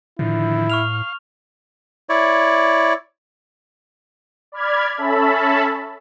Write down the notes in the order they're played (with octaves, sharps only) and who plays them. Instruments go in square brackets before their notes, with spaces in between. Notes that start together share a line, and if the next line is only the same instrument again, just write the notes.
[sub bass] A2 [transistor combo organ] D3 D#3 F3 [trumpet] E4
[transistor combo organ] F5 [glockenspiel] C#6 F6 F7
[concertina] E4 C#5 D5
[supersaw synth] D5 B5 F6 G#6
C#4 A4 E5 A5 B5